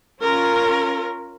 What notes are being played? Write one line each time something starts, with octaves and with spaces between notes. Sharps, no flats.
C#4 F4 A#4